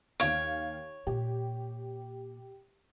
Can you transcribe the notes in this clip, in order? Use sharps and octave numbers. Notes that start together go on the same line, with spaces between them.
D#2 C#5 F5 D7
A#2 G4